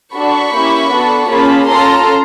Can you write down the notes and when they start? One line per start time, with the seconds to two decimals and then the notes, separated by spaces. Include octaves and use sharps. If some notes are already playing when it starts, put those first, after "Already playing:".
0.14 D4 F#4 A4 B5 C#6
0.52 A#3 C#4 E4 G4
0.91 B3 D4 F#4 A4
1.29 A#3 C#4 F4 G#4 A5 B5
1.67 C#4 F4 A4 A#5 C6